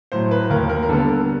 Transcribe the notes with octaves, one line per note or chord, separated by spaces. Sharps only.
A2 F#3 C5
B4
D#2 A#4
A#4
A#4
D3 G3 B3 A4
A#4